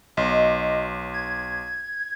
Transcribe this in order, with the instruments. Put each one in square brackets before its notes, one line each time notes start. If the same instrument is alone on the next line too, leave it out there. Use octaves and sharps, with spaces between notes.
[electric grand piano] B1 [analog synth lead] D#5
[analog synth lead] G#6